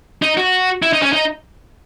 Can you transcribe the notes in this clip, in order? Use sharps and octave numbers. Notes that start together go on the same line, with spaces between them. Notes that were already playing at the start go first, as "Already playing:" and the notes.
D#4
F#4
E4
D#4
C#4
D#4